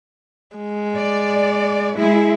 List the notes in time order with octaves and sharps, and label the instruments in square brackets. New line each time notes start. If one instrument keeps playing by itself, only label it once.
[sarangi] G#3
[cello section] D5
[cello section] G#3 E4 [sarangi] G#4